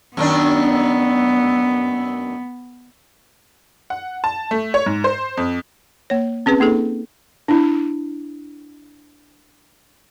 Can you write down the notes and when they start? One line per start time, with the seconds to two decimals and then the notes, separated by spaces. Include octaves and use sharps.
0.17 F#2 D#3 B3 D4
3.90 F#5
4.24 A5
4.51 A3
4.74 C#5
4.86 G#2
5.04 C5
5.37 F2
6.10 A#3 C#5
6.46 C4 C#4 G#4 B4
6.60 A#3 D#4 G#4 A4
7.48 D4 E4